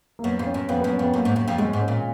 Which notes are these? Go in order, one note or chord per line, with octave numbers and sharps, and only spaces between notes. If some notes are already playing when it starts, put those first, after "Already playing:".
A#3
F#2 B3
F2
C#4
F#2
F2 B3
B3
F#2
C#4
F2 B3
F#2 A#3
G#2
F#2
F2
F#2 G#3
G#2
C#4
A#2